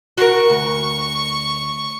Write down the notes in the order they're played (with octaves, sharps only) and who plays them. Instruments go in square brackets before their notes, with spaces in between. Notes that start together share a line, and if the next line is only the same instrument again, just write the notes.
[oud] F#4 A#4 [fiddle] C#6
[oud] D2